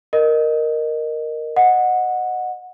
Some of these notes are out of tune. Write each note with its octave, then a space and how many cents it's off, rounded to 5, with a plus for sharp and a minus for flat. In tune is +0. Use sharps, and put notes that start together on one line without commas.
A#4 +0 D#5 -15
D#5 -15 F#5 -15